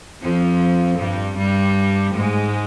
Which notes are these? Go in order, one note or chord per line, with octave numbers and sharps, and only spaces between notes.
F2 F3
G2 G3
G2 G3
G#2 G#3